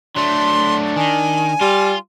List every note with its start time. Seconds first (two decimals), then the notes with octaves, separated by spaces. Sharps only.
0.16 F#3 A3 D4 C6
0.96 D#3 G#5
1.61 G3 F4